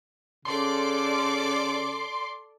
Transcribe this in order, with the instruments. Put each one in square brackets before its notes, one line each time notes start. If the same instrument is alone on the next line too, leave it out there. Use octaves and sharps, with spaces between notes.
[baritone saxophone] C#3 [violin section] A4 D5 D6 [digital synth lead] C6